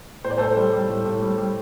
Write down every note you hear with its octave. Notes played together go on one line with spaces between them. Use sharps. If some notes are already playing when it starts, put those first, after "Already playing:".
A2 C5
D5
A2 A4 C5
G3
G3
A2
A2
G3
G3